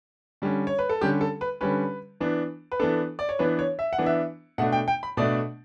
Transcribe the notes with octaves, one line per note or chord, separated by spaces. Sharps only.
D3 G3 C#4
C#5
B4
A4
D3 G3 C#4 G4
A4
B4
D3 G3 C#4 B4
E3 B3 D4
B4
E3 B3 D4 A4
D5
C#5
E3 B3 D4 B4
C#5
E5
F#5
E3 B3 D4
E5
B2 A3 D4 F#5
G5
G5
B5
B2 A3 D4 D5